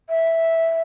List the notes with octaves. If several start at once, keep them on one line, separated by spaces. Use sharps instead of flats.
E5